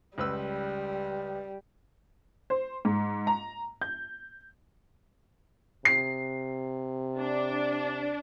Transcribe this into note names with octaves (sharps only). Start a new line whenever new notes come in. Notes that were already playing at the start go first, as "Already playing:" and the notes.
C#2 G3 B4 E6
C5
G#2
A#5
G6
C3 C7
D4